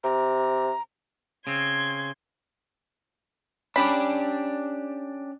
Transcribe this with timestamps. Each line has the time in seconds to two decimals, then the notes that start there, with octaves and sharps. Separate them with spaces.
0.04 C3 A#5
1.47 C#3 C4 C6 G#6
3.76 C#4 D4 G4 D5 B5